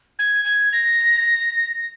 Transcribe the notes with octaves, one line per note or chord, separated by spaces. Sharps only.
G#6
G#6
A#6